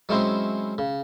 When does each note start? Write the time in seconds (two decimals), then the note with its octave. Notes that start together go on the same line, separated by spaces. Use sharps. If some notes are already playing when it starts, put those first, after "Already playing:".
0.09 F#3 G#3 C4 C#4 E4 C5
0.78 C#3